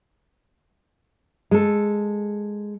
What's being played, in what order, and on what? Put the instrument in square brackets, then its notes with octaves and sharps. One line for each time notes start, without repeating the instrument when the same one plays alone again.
[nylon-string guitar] G#3 A4